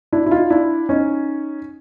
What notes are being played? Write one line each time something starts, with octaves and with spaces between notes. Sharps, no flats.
D4 E4
E4
D#4 F4
D4 E4
C#4 D#4